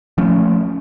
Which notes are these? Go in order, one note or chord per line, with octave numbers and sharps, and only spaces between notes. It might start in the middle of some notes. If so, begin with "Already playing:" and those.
F3 A3 C#4